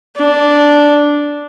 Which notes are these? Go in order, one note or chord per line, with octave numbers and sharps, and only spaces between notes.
D4